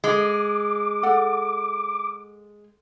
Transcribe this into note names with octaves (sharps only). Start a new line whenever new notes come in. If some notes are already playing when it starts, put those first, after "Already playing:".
G#3 D6
A4 F#5